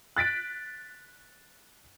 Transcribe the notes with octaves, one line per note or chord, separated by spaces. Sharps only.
F#6 A6 B6 D7